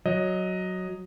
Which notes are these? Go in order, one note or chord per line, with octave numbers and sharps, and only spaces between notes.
F#3 D#5